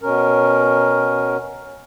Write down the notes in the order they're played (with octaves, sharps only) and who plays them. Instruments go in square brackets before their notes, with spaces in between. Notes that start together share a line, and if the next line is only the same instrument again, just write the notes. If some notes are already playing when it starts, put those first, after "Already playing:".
[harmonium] B2 C#4 A#4